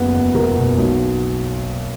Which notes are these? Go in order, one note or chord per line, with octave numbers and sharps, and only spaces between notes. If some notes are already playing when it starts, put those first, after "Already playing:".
Already playing: F#1 B3
E2
F#1 A#4
B2
B1